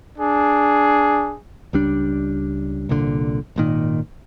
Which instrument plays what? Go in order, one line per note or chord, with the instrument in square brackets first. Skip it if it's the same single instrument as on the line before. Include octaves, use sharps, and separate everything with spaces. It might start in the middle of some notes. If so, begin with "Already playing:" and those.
[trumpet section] D4 G#4
[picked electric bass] C#2 G3 D4
C2 A#2 D3
G#1 A#2 D#3